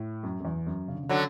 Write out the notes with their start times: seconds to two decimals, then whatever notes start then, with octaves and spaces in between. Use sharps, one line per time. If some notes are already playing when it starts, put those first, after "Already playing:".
Already playing: A2
0.23 F#2
0.40 F#2
0.45 E2
0.67 F#2
0.88 C#3
0.95 D3
1.03 C#3
1.09 D3 F#3